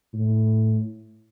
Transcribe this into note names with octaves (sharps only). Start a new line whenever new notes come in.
A2